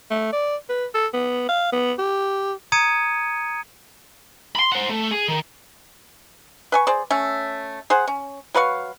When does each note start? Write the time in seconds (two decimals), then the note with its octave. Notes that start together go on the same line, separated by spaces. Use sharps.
0.11 A3
0.33 D5
0.69 B4
0.94 A4
1.14 B3
1.49 F5
1.72 B3
1.99 G4
2.72 A#5 D#6 G#6 C#7 D#7
4.55 B5 C6
4.72 C5 F#5
4.89 A3
5.11 G#4
5.28 D#3
6.72 B4 G#5 C#6
6.87 G#4 C5 D5
7.10 A3 C#4
7.90 G#4 C5 F#5
8.07 C#4
8.54 F#3 B4 F5 C#6